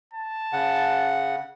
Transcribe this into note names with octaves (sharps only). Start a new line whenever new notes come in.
A5
C#3 F#5